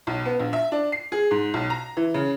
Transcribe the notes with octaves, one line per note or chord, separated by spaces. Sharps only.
B1
B3
A#1
E5
D4
C7
G#4
G#2
B1
A#5
E3
C#3